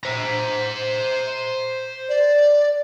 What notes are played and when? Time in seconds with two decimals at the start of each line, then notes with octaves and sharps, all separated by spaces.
0.04 C5 A#5
2.09 D5